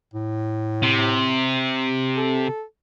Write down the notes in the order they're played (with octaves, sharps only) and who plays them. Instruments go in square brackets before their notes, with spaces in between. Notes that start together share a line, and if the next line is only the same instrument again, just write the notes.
[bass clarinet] A2
[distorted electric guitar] C3
[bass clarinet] A4